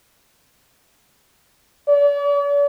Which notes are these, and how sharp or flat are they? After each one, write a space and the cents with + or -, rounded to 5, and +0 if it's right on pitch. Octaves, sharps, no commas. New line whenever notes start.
D5 -45